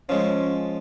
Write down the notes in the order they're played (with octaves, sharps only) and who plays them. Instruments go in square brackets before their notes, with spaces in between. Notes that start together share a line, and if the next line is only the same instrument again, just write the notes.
[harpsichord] F3 G#3 [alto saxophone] C#4